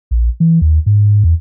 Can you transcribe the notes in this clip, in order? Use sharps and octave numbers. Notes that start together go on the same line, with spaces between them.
A#1
E3
D#2
G#2
E2